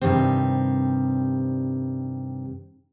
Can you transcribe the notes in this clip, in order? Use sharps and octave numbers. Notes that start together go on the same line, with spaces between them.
G2 C3 D#3 G3 C4